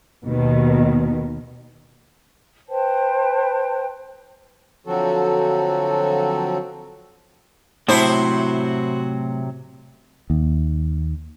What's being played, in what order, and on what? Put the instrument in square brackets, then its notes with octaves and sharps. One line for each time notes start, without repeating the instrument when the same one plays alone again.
[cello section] D#2 B2 D#3
[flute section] B4 C5 G5 A5
[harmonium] D3 F3 F#3 C4 F#4 A4
[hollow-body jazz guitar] A2 [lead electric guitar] C3 F#3 [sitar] E4 C5 [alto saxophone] F#4
[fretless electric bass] D#2